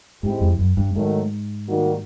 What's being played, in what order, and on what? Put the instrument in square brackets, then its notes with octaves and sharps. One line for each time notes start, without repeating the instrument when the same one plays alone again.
[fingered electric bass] G#2 [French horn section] G#3 C4 E4 G4
[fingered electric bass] F2
F#2
G2
[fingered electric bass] G#2 [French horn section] D#3 F#3 A3
[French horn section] D#3 G3 A#3 D#4 F#4